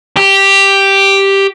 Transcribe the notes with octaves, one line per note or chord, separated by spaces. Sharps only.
G4